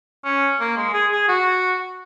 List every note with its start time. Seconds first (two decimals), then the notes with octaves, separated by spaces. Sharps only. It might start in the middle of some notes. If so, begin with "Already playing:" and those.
0.24 C#4
0.60 A#3
0.77 G#3
0.93 G#4
1.12 G#4
1.28 F#4